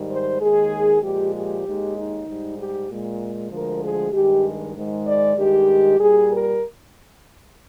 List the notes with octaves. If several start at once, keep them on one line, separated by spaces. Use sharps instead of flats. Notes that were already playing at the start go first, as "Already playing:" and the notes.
Already playing: G#2 D#3 G3
C5
D#2 D#3 G#3 G#4
A#2 F3 G#3 G4
G4
D#2 D#3 G#3
D#4
G#2 G3
G4
A#2 G#3
D2 D3 F3 G#3 A#4
G#4
G2 D#3 G#3 G4
G#2 D#3 G#3
D5
G2 D#3 G#3 G4
A#2 G3 G#4
A#4